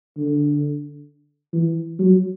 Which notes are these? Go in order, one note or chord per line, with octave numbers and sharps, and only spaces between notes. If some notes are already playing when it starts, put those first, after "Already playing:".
D3
E3
F#3